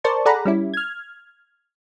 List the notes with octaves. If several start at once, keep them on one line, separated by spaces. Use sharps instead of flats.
A#4 C5 D5 A5 C#6
G#4 A4 D5 F#5 A#5 B5
G3 C#4 E4
F6 G#6